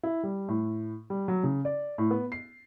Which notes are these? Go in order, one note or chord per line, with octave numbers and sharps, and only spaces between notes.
E4
G3
A2
G3
F#3
C#3
D5
A2
B3
C7